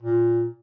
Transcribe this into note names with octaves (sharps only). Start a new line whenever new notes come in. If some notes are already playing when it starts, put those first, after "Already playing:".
A#2